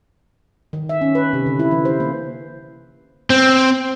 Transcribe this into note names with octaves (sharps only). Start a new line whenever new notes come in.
D#3
E5
C#4
B4
C3
D3
E4
E3
C5
A#3
C4